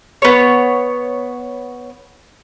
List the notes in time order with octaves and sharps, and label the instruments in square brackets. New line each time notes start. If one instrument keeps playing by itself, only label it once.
[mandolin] B3 C#5